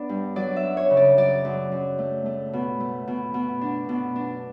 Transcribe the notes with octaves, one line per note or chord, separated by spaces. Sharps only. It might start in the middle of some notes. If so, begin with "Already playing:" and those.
Already playing: B3 D4 D5
G2
F#3 D5
E5
F#2
C#5
C#3
D5
F#2 D5
F#2
F#2
A3
A3
B2
A3
B2
B2
D4
B2
D4